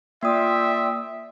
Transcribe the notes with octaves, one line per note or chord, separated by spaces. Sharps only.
A#3 F4 D5 E5 G5 D#6